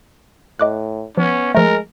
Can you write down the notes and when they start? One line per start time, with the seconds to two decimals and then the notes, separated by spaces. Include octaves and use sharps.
0.59 A2 D#5 D6 F#6
1.18 F3 B3 C#4
1.55 F3 G#3 A3 A#4